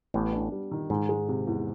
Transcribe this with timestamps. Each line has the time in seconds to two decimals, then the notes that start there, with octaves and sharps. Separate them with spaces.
0.14 A1 A2 B3
0.32 D4
0.52 G3
0.71 D#3
0.90 G#2 D#3
1.09 G#3
1.29 C3
1.47 E2